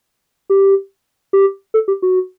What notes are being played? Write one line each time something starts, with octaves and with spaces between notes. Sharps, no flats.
G4
G4
A4
G4
F#4